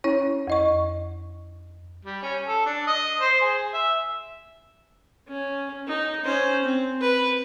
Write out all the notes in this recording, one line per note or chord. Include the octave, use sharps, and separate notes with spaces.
C#4 E4 C#5
F2 D#5 C#6
G3
C#4
A4
D4
D#5
C5
G#4
E5
C#4
D#4
C#4 C5
C4
B4